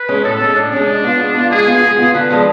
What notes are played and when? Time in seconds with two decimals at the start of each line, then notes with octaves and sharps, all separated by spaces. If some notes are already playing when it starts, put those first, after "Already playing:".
Already playing: B4
0.09 G#3 C#4
0.24 A2 A4
0.40 G#3 C#4
0.56 A2 D4
0.72 G#3 C#4
0.87 G#3
1.04 B3 F4
1.19 G#3
1.35 B3 F4
1.51 G#3 G#4
1.67 B3 F4
1.83 G#3
1.98 B3 F4
2.14 D3 B4
2.30 F3 G#3 D4